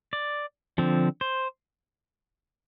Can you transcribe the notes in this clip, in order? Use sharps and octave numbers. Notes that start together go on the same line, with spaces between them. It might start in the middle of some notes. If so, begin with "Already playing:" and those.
D5
D3 F3 C4
C5